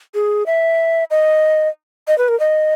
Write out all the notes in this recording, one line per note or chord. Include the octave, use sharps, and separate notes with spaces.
G#4
E5
D#5
D#5
B4
A#4
D#5